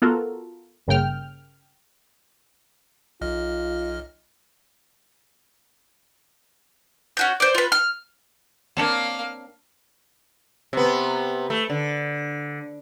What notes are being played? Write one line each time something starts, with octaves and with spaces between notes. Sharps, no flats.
B3 F4 F#4 A4 A#4
G1 G2 C#3 A#3 G5 F6
B1 F4 D#5 F6
C#4 F#4 G6
C5 D5
F4 B4
F6
A#3 C4 D4 C#5 F5
C3 B3
A3
D3